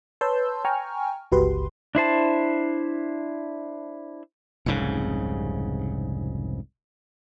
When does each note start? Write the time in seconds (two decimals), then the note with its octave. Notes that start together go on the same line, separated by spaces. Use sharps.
0.21 B4 C#5 A5 C6 E6 G6
0.65 G5 G#5 A#5 C#6 F6
1.32 G1 C#2 F#4 G4 B4 C6
1.95 D4 E4 C5 A5
4.66 F1 C2 G#2 C#3